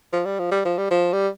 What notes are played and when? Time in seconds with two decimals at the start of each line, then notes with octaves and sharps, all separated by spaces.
0.13 F3
0.25 G3
0.39 F3
0.51 G3
0.65 F3
0.78 G3
0.91 F3
1.13 G3